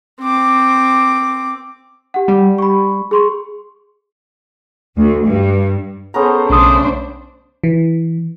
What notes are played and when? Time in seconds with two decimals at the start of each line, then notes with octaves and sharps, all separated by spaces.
0.21 C4 D6
2.14 G4 F#5
2.28 G3
2.58 B5 C#6
3.11 G#4 C6 C#6
4.97 D2
5.26 G2
6.14 B3 C#4 G#4 A4 C5 A#5
6.50 B1 C#3 A3 D4 C5 D#6
7.64 E3